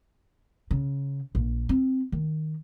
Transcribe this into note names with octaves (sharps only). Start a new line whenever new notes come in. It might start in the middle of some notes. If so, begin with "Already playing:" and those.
C#3
A#1
C4
D#3